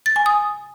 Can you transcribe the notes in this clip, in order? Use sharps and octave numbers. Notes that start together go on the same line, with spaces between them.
A6
G#5
D#6